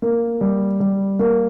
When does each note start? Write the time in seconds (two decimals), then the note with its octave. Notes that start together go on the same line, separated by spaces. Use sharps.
0.02 A#3
0.41 G3
0.80 G3
1.19 A#3